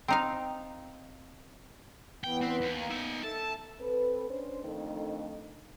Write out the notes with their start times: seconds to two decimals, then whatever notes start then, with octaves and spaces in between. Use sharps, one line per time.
0.08 C4 D#4 F5
2.24 E2 E3 B3 G5
2.41 C4 B4
2.61 D#2
2.76 A#3 B3 G#5
2.90 D#4 E5
3.23 A4 E5 A5
3.79 C4 A4 B4
4.29 C#4 D4 C5
4.63 F2 D#3 A3 D4 D#4